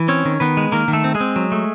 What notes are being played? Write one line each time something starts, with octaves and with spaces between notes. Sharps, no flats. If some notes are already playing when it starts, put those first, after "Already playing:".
Already playing: E3
C4 C#4 C#5
D#3
D#3 B3 B4
G#3
D#3 A#3 A#4
D#3
A3 A4
C4
G#3 G#4
C4
F#3
A3